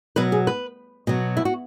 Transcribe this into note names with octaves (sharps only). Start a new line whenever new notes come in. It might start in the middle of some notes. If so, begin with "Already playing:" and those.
B2 F#3 B4
G#4
B4
B2 F#3
E4
F#4